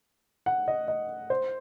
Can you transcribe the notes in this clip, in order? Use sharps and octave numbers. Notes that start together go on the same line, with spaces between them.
F#5
D#5
D#5
C5